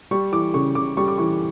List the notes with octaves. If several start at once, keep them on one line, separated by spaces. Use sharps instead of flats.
G3 C#6
E3 D6
C#3 C#6
C#3 D6
G3 C#6
D6
E3 C#6